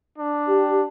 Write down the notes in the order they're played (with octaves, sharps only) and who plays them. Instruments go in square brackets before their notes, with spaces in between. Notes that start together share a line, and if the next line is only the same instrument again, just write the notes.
[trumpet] D4
[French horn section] G4